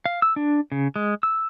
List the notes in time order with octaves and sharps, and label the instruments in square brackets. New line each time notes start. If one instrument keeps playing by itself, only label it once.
[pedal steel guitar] F5
E6
D4
C#3
G#3
E6